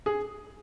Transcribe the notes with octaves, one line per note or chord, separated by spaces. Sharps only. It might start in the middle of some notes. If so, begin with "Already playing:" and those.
G#4